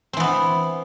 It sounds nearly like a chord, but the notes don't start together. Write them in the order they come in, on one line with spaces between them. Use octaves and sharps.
C4 E3 B3